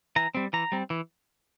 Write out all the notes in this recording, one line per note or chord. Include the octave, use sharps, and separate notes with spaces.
E3 A#5
G3 C4
E3 A#5
G3 C4
E3